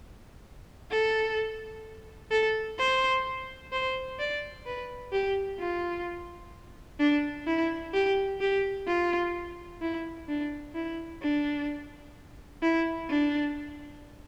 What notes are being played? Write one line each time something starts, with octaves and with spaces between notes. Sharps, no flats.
A4
A4
C5
C5
D5
B4
G4
F4
D4
E4
G4
G4
F4
E4
D4
E4
D4
E4
D4